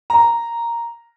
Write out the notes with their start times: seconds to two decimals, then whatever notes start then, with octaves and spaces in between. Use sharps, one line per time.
0.10 A#5